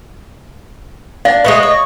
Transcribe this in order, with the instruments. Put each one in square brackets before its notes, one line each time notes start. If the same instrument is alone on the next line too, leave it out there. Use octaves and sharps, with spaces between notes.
[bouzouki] D4 [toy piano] F5
[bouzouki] G#3 A3 B3 [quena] D#5
[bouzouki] C#5